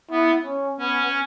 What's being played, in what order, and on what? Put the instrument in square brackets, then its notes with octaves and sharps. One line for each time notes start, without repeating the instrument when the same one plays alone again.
[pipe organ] B3 [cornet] E4
[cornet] C#4
[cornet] B3 [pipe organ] C#4